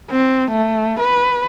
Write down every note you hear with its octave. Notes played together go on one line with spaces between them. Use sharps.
C4
A3
B4